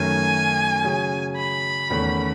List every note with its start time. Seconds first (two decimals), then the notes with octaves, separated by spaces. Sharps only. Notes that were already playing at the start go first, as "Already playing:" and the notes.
Already playing: F#2 D#3 A3 C#4 G#5
0.84 C#3 F#3 C#4 G#4
1.37 B5
1.90 E2 D#3 A3 C#4 E4